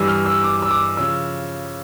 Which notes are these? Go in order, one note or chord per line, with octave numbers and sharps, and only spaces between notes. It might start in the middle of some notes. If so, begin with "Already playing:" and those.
Already playing: G2 E3 G3 E6
F6
E6
D6
E6
D6
C#3 F3 E6